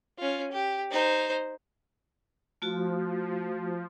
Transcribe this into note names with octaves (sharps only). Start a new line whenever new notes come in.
C#4 F4
G4
D#4 C5
F3 A3 F4 F#4